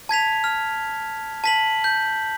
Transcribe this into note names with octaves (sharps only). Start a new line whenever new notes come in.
A5 G#6 B6 F7
F6
A5 B6 F#7
G6